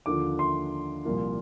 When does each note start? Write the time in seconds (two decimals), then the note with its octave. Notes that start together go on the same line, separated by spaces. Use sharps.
0.06 D#2 D3 F3 A#3 F4 D6
0.39 C6
1.05 C2 A#2 F3 A#3 F4